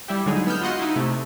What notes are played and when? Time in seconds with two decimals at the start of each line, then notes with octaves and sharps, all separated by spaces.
0.08 G3 E4 G4
0.26 D3 F#3 G#3 D#4 G#4
0.47 B3 E6 F6 G6
0.62 F4 F#4 D#5 F#5 C6
0.79 D#4 E4
0.96 C3 A3